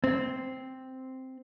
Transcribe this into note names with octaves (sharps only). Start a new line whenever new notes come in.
C4